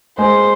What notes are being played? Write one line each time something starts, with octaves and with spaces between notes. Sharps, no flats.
G#3 G#4 C5